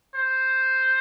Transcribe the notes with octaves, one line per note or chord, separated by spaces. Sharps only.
C5